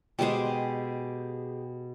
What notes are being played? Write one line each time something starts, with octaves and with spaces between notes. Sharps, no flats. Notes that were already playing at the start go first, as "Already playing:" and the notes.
B2 G#3 G4 G#4 C5